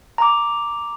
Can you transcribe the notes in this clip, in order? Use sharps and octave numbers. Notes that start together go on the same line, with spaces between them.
A#5 D6